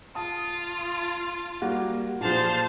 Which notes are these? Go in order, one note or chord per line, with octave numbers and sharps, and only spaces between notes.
F4 A5 D#6
G3 A#3 F#4
A#2 F3 C5 F5 A5